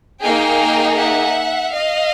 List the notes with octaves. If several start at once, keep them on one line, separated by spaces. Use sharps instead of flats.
A#3 D#4 G#4 F5 G5
E5 F#5
D#5 F5